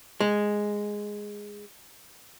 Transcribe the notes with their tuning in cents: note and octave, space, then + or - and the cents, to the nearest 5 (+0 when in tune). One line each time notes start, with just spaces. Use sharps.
G#3 -5